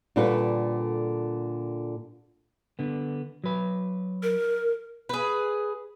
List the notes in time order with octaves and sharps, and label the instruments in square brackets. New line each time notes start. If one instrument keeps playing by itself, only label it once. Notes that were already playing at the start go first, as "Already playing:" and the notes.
[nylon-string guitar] A#2 D3 G3 F#4 A4 B4
[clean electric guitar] D3 B3
F#3 B4
[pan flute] A#4
[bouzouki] G#4 B4